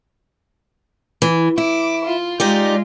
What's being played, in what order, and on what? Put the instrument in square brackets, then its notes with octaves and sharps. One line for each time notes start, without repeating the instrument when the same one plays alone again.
[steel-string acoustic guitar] E3
[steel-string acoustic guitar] E4 [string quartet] D6
[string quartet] F4
[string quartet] G#3 F4 [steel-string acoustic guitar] D#4 G4 D5